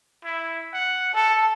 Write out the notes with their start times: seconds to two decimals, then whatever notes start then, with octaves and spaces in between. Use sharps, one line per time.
0.24 E4
0.73 F#5
1.14 A4 A5